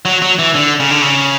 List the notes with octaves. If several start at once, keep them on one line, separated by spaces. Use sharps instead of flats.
F#3
F#3
E3
D3
C#3
D3
C#3